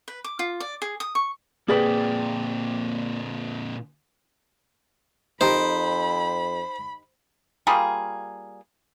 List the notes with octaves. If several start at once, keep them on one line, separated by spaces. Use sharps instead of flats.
B4
D6
F4
D5
G#4
D#6
C#6
A#2 A#3 C4 G#4 B4 D5 G5
F2 D#4 G4 A#4 C5 B5
G3 A#3 F4 G#4